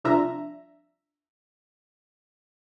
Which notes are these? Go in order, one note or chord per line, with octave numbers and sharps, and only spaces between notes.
C2 F3 D4 F4 E5 A#5